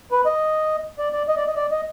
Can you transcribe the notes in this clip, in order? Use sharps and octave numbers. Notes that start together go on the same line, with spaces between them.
B4
D#5
D5
D5
D#5
D5
D#5
D5
D#5